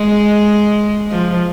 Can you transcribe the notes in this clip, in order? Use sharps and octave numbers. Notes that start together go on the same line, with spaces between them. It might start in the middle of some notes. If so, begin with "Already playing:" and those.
Already playing: G#3
F3